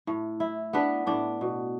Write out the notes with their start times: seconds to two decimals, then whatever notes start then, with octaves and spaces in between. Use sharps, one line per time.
0.07 A2
0.40 E4
0.73 B3 D4 B4
1.06 A2 D4 D5
1.41 B2